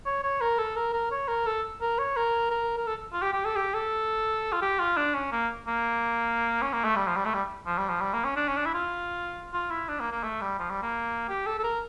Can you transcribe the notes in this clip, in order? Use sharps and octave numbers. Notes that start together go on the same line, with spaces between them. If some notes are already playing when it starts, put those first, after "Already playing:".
C#5
C#5
A#4
A4
A#4
A#4
C#5
A#4
A4
A#4
C#5
A#4
A#4
A#4
A4
F4
G4
G4
A4
G4
A4
F4
G4
F4
D4
C#4
A#3
A#3
C#4
A#3
A3
G3
F3
G3
A3
G3
F3
G3
F3
G3
A#3
C#4
D4
C#4
D4
E4
F4
F4
E4
D4
A#3
A#3
A3
G3
F3
G3
A#3
G4
A4
A4
A#4